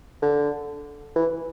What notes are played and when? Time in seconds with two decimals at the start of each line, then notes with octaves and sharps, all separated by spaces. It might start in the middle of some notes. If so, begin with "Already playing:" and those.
0.22 D3
1.16 E3